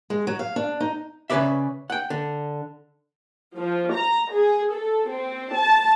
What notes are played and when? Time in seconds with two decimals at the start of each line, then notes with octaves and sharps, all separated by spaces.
0.10 G#3
0.27 F#3
0.39 F5
0.56 D4
0.80 D#4
1.30 C#3 C#4 F4 B4 D5 E5
1.90 F#5 G5
2.10 D3
3.56 F3
3.94 A#5
4.32 G#4
4.74 A4
5.10 C4
5.54 A5